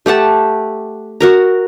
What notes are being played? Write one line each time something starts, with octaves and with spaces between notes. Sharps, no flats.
A3 G4 F#5 A5
F#4 A#4 A#5